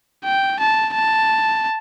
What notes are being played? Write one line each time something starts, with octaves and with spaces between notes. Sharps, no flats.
G5
A5
A5